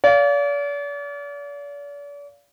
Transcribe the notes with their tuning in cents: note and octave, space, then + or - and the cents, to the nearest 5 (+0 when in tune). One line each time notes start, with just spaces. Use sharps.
D5 -40 F5 +0